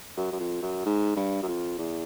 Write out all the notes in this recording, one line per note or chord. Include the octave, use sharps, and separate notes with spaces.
F#2
F#2
F2
F#2
G#2
G2
F#2
F2
E2